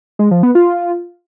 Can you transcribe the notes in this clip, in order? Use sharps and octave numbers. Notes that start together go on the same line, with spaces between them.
G#3
F3
B3
F4